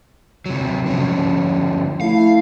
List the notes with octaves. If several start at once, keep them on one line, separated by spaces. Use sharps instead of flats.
C3 F#3
D3 F3 C#4
A3 E4 F5